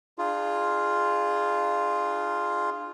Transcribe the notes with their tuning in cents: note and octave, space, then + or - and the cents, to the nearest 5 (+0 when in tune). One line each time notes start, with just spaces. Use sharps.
D4 +40 F4 +0 G#4 +0